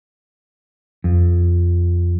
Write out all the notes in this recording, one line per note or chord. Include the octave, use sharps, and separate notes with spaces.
F2